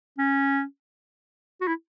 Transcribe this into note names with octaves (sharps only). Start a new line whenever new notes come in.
C#4
F#4
E4